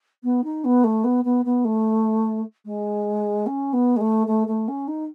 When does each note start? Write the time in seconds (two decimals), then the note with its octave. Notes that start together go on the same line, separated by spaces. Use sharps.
0.23 B3
0.44 D#4
0.64 B3
0.84 A3
1.04 B3
1.24 B3
1.45 B3
1.64 A3
2.65 G#3
3.46 C#4
3.73 B3
3.96 G#3
4.00 A3
4.27 A3
4.47 A3
4.68 C#4
4.87 D#4